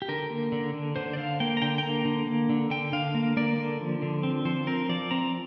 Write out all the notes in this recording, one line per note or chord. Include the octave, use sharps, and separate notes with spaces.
G4
D3 A#4
A#3
D3
D3
D3 C5
D5
D3 F5
A#3 G5
A#5
D3 G5
G5
A#3 A#5
D3
A#3
D3
D3 G5
D3 F5
A#3
A#3 D5
D3
F3
D3
C4
F3 C5
C4 A#4
F3 D5
C4 A#5